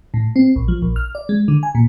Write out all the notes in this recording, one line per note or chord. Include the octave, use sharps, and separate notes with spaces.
A2
C4
A#1
F3
A#1
F6
D5
G#3
D3
G#5
A#2